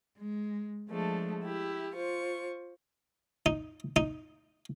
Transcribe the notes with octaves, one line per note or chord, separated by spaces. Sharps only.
G#3
F3 G#3 A3 D4
E4 G4
F4 C5 C#6
D#4
D#4